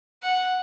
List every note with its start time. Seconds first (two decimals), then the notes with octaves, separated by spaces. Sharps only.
0.23 F#5